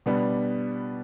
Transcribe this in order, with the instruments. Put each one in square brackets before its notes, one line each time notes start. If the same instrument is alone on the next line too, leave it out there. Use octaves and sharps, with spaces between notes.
[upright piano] B2 G3 B3 D4